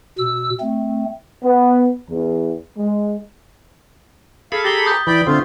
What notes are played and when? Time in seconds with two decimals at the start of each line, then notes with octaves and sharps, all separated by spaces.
0.19 B2 E6
0.60 A3 C4
1.44 B3
2.09 E2
2.76 G#3
4.52 G#4 A4 F5 B5
4.64 G4 A#5 A6 G7
4.86 D#6 G6 B6
5.07 E3 D5 G5 B5
5.27 D3 A3 C4 F4